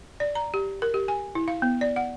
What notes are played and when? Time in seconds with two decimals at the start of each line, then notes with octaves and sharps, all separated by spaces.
0.20 D5
0.35 A#5
0.54 G4
0.82 A#4
0.94 G4
1.08 G#5
1.35 E4
1.48 F5
1.62 B3
1.81 D5
1.96 F#5